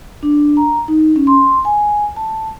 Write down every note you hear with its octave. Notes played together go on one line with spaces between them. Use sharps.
D4
A#5
D#4
C#4
C6
G#5
A5